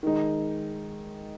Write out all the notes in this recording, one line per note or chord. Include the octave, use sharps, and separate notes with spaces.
D#3 G#3 D#4